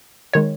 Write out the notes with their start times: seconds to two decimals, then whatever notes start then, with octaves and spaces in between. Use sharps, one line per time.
0.33 D#3 G#3 C#5